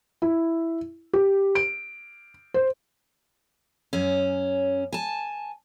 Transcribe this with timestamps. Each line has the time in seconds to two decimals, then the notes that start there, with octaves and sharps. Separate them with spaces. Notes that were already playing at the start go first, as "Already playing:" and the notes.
0.22 E4
1.13 G4
1.55 D7
2.54 C5
3.93 F#2 C#4
4.93 G#5 A5